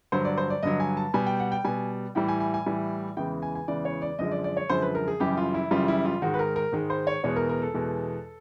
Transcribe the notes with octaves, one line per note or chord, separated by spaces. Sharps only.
G2 D3 F#3 C5
D5
C5
D5
G2 D3 F#3 D#5
G#5
A5
B2 G3 G#5
G5
F#5
G5
B2 G3 G#5
A2 E3 G3 G5
G#5
G#5
G#5
A2 E3 G3
E2 C#3 E3 G#3 G5
G#5
G#5
E2 C#3 E3 G#3 D5
C#5
D5
F#2 D3 F3 G#3 D#5
D5
D5
C#5
F#2 D3 F3 G#3 C5
B4
A#4
G#4
F#2 C#3 E3 G3 G4
F4
E4
F#2 C#3 E3 G3 F4
E4
F4
G#2 D#3 G#3 F#4
B4
A#4
A#4
G#2 D#3 G#3
C5
C#5
E2 B2 G#3 C#5
A#4
A#4
A4
E2 B2 G#3